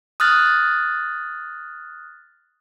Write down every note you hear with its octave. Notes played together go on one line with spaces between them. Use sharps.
D#6 F6 F#6 A6